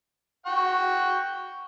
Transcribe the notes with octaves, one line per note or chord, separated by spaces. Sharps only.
F#5 G5 C#6